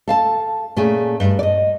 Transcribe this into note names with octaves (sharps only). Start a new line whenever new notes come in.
A4 F5 A5
A#2 A3 C#4 G#4
G2
D5 D#5